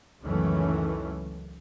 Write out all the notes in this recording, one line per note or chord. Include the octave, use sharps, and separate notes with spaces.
C#2 F#2 D#3 E3 A3 C#4